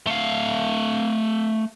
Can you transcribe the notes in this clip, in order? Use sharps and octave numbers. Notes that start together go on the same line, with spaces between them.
A3 F5